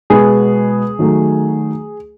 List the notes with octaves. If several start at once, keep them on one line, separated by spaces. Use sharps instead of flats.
B2 G#3 B3 G#4
D#3 F#3 A3